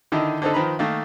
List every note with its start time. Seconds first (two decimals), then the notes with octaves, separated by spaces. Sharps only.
0.12 D3 D#3 D#4 E4
0.42 D3 C4 D#4 A4
0.54 D#3 F3 B4 A#5 B5
0.79 D#3 A3 A#3